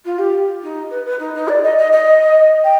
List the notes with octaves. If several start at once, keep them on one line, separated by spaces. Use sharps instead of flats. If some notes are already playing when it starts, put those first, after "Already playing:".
F4
G4
D#4
B4
B4
D#4
D#4
D5
D#5
D#5
D#5
G5